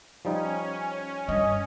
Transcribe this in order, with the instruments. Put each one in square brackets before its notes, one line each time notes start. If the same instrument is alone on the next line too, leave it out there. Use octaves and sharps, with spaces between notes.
[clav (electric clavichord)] F3 G3 D#4 [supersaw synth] C#4
[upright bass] G2 [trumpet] D#5